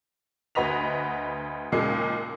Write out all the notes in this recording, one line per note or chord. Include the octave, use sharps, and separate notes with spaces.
D2 F#4 B4 D#5 B6 F7
D#2 A#2 C#3 G#3 C7